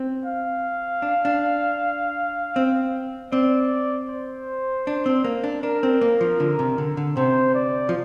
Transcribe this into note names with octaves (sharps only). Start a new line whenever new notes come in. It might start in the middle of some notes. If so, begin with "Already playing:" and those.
Already playing: C4
F5
D4
D4
C4
C4 D5
C5
D4
C4
A#3
D4
D4 A#4
C4
A#3
F3
D3
C3
D3
D3
C3 C5
D5
F3